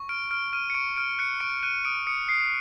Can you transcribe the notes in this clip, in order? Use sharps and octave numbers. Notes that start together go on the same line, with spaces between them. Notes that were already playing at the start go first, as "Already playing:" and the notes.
Already playing: C#6
F6 D7
F6 D7
F6 D#7
C#7
C#6 D7
F6 D7
F#6 C#7
C#6 D7
F#6 D#7
D#6 D7
D#6 C#7
D#6 C7